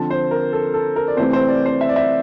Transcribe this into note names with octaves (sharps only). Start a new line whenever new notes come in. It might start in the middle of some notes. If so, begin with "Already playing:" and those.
Already playing: D3 F3 C4 A5
C5
A#4
A4
A4
A#4
D5
C3 E3 A3 C4 C5
C5
D5
C5
E5
D5
E5